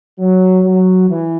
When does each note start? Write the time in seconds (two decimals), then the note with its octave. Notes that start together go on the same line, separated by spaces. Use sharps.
0.19 F#3
0.63 F#3
1.08 E3